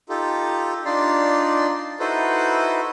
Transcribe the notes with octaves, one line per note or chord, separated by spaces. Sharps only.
D#4 F4 G4 A4
D4 D#4 F4 D5 C6
D#4 E4 F#4 A4 B4 C5